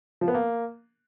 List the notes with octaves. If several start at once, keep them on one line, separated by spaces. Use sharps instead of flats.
F3
B3
A#3